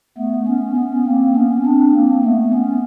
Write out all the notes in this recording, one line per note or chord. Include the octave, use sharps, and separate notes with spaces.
A3 B3
B3 C#4
B3 C#4
A#3 C4
B3 C#4
C4 D4
A#3 C4
A3 B3
B3 C#4